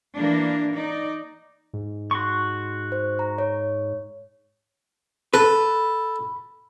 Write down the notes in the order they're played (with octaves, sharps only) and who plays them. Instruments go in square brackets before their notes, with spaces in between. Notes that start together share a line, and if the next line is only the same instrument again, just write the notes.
[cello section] E3 A#3 D4
D#4 D5
[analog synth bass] G#2
[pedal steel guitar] F#4 C6 C#6
[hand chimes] C5
A#5
C#5
[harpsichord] A4 [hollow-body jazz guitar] B4